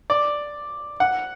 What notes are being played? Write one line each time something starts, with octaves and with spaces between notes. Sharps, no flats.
D5
F#5